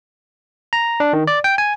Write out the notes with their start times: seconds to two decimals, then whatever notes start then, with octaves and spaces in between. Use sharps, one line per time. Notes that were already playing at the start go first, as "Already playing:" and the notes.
0.73 A#5
1.00 D4
1.13 D#3
1.27 D5
1.44 G5
1.58 G#5